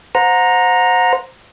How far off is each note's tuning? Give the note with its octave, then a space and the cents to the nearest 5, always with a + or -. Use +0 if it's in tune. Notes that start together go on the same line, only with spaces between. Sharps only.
C5 -5 F#5 -30 A#5 +0